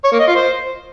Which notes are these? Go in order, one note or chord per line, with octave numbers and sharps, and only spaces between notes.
C#5
A#3
D#5
F4
C5